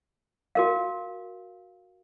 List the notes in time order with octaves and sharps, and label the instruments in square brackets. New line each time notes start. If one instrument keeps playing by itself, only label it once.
[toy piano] F#4 A#4 F5